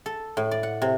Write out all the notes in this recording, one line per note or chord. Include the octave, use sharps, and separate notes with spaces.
A4
A2
D5
F#5
C3